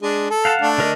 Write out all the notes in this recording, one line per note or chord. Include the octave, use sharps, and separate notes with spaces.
G#3 D4
A4
F5 F#5 A5
A3 D4
D3 A#4 D#5